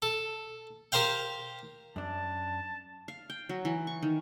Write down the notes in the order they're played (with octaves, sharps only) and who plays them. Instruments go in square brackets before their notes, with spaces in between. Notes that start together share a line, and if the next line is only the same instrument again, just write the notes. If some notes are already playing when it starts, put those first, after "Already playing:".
[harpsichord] A4
G4 A#4 C5 F5 G5
[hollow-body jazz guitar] F#2 D4 [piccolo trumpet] A5
[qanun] F5
G5
F#3
E3
C#6
D#3